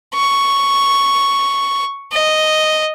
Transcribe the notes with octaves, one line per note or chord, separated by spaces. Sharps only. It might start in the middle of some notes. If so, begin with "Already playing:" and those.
C#6
D#5